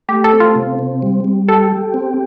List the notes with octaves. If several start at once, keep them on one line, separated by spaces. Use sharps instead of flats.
A3 G4
A4
C4
F4
C3
C4
G3
G3
G4 A4
G4
C4